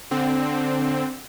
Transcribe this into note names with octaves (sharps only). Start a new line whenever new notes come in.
D3 C4